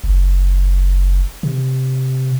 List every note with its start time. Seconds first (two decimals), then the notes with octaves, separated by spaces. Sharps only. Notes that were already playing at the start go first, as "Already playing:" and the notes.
0.04 F#1
1.43 C3